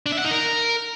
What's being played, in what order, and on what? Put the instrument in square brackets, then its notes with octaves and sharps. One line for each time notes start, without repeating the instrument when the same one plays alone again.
[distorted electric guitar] D4
E5
F#5
D#4
A#4